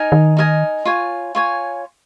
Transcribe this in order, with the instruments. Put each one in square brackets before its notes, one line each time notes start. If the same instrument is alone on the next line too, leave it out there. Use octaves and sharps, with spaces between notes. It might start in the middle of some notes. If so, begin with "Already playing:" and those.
Already playing: [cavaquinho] D#4 A#4 D#5 G#5
[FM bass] D#3
[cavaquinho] D#4 A#4 D#5 G#5
F4 C#5 G#5
F4 C#5 G#5